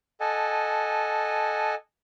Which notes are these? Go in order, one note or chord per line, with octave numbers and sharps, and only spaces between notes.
A4 D#5 F#5 G#5 A5